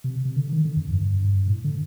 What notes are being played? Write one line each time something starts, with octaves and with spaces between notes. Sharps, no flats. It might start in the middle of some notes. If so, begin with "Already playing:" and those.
C3
C3
D3
D#3
D3
F2
G2
G2
G2
A2
D3